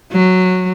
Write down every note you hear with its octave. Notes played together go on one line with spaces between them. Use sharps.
F#3